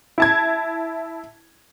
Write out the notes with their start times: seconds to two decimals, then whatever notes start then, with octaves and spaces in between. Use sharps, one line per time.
0.18 E4 A5 G#6